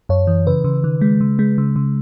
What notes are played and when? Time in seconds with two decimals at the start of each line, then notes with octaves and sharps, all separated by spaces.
0.09 F#2 C#5
0.27 E3
0.47 C#3 B4
0.64 C#3
0.84 D#3
1.01 G#3
1.21 C#3
1.39 G#3
1.58 C#3
1.76 C#3